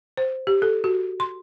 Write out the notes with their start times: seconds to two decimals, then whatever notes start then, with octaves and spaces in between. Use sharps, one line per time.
0.17 C5
0.47 G4
0.62 A4
0.84 F#4
1.20 C6